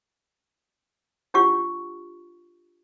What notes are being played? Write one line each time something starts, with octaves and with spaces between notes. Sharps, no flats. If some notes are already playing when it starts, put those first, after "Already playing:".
D4 F4 G4 F#5 C#6